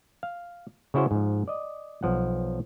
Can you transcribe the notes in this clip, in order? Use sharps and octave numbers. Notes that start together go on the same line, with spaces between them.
F5
C#3 C#4 E4 F#4 C5
G#2 F3
D5 D#5
B1 F3 F#5